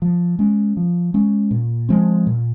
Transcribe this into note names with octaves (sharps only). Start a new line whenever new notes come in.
F3
G#3 C#4
F3
G#3 C#4
A#2
F3 G#3 C4
A#2